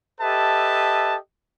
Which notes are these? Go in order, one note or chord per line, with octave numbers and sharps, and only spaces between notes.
G4 A4 B4 D#5 E5 A5